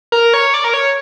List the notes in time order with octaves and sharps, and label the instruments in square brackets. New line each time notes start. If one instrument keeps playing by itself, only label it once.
[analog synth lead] A#4
C#5
D5
A#4
C#5